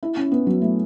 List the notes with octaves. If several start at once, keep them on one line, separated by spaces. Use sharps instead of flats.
E4
C#4
B3
F#3
A3